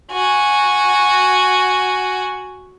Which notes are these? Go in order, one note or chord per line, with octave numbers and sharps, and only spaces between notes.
F#4 G#5